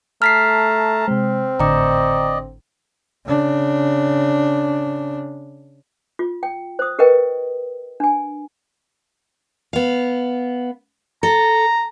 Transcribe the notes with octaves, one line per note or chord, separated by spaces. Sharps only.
A3 A5 A#5 F6 B6 C7
C3 G#3 C4
G#1 A2 D3 D5 D#5 G5 A#5
C#3 D4
F4
G5
C5 D#6
G4 A#4 B4 D#5 G5
D4 G#5
B3 F5
A4 A#5